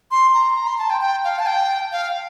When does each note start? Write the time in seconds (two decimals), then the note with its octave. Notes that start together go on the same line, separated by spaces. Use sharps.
0.11 C6
0.34 A#5
0.56 A#5
0.67 C6
0.78 A5
0.90 G5
1.01 G5
1.24 F5
1.39 A5
1.46 G5
1.92 F5